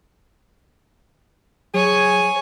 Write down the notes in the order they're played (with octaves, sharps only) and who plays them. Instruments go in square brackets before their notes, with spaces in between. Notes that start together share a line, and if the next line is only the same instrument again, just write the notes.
[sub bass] F#3 [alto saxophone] G#4 [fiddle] C#5 G#5